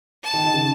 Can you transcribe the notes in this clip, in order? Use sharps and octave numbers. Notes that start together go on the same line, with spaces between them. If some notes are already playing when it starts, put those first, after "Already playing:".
A5
D#3
D#3
C#3